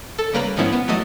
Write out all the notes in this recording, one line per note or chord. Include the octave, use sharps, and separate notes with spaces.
A4
C#3 G3 A#3 B4 A#5
G#2 D#3 F3 B3 C#4 E4
B3
E3 F#3 A3 D#5